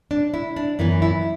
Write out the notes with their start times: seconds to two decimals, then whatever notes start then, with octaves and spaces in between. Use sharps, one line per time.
0.11 D4
0.34 E4
0.56 D4
0.79 F#2 E3 B3 E4
1.02 E4